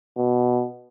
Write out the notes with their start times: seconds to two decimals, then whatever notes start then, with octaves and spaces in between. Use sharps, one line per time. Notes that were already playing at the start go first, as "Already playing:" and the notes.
0.17 B2